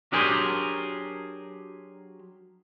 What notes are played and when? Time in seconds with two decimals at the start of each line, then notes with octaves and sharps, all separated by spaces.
0.12 F#3 D4 G4 G#4 A#4 C5